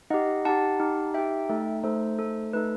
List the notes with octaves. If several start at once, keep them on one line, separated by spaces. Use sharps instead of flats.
D#4 G4 D#5 F#5
D#4 G4 F#5 A5
D#4 G4
D#4 G4 E5 G5
A3 D#4 A4
A3 D#4 A4 C5
A3 D#4 A4
A3 D#4 A4 B4